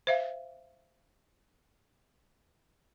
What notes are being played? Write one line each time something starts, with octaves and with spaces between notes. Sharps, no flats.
C5 E5 F5